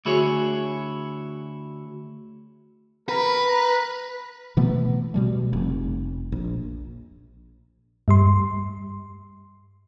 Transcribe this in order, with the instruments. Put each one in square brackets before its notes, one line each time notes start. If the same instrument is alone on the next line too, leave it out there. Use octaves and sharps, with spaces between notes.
[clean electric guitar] D2 E4 F#4 G#4 C#5
[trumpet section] A#4 A#5 B5 [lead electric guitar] B4
[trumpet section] A#5
[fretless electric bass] B2 E3 A3 B3
B2 G3 A3
F1
A#1
[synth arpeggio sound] G2 G3 C6